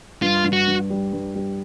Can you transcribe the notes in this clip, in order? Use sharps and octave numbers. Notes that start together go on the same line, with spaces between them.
G2 F4
G2
F#4
G2
G3
G2
G3